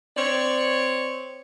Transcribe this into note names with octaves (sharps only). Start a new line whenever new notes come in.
C4 C#5 D5